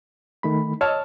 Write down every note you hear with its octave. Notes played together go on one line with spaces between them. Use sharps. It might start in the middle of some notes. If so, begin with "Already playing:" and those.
D#3 A3 B5
C#5 D#5 A5 E6 F6